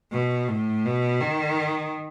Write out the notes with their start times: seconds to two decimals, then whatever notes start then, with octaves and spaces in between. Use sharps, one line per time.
0.12 B2
0.48 A2
0.85 B2
1.21 D#3